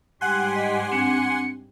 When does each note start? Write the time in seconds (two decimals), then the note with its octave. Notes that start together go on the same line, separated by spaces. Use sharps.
0.21 G#2 G3 G4 F#5 G#5 C6 F#6
0.55 D#5 B6
0.92 C4 D4 C#7